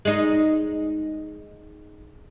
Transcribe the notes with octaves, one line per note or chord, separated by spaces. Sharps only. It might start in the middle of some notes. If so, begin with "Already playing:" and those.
G#3 D#4